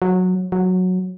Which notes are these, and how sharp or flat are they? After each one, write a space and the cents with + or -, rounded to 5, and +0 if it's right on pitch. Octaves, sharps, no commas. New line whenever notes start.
F#3 -15
F#3 -10